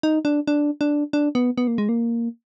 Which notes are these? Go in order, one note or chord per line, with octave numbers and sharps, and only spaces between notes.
D#4
D4
D4
D4
D4
B3
B3
A#3
G#3
A#3